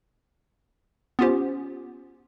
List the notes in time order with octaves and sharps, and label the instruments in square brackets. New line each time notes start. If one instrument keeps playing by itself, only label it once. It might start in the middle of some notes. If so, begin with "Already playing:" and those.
[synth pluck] B3 C#4 F4 G4 C5